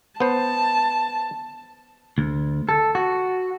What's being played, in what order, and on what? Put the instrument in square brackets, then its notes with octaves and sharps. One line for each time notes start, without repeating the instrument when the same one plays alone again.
[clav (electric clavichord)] B3 C5 [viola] A5
[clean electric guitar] D2
A4
F#4